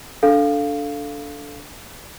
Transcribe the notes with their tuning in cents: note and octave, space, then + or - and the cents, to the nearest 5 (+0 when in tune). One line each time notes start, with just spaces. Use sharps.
D4 -15 A4 +0 F5 +0